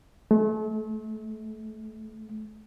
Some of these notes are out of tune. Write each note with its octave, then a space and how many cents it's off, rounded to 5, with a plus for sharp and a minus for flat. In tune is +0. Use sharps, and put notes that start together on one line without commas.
A3 -35